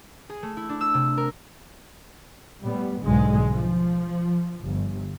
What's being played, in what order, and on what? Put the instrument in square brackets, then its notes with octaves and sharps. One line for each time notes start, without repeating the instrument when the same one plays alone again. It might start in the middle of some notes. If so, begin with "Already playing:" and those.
[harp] G#4
A3
E4
D4
E6
C3
A#4
[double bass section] A2 G3 B3
B1 G#2 D3 G#3
F3
G1